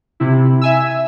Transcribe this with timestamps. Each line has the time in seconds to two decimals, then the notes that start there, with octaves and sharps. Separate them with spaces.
0.20 C3 E4
0.61 E5 G#5 E6